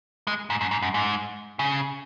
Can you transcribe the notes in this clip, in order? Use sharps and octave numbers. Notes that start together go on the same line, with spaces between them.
G#3
G#2
F#2
G#2
F#2
G#2
C#3